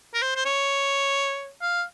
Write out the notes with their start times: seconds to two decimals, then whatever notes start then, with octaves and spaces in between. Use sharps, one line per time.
0.14 A#4
0.22 C5
0.36 C5
0.46 C#5
1.62 F5